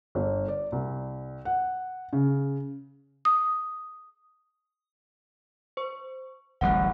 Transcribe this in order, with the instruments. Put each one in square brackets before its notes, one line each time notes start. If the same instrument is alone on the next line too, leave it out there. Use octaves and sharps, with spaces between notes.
[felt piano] G1
D5
C2
F#5
C#3
[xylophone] D#6
[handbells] C5 C#6
[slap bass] D1 A1 G3 [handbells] F#5 F#6